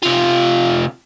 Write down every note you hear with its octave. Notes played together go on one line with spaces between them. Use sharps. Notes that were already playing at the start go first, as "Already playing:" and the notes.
C3 F4